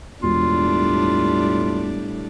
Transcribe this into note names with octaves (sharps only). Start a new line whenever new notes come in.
E1 A2 G3 D4 F4